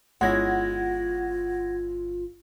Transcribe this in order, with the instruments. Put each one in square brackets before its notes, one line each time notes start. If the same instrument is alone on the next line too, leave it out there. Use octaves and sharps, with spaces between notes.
[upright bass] G1 [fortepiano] G#3 C#4 E4 [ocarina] F4 [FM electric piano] F#5 G#6 A#6